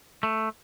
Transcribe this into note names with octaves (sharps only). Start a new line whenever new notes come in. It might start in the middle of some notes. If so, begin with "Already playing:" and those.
A3